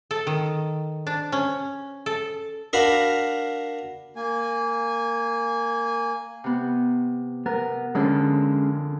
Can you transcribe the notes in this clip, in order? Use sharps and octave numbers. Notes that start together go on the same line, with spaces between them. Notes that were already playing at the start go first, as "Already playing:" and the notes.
A4
D#3
D4
C#4
A4
D4 F#4 A#4 F5 B5
A#3 G#5
C3 B3
B3 A#4
F2 D3 G#3 C#4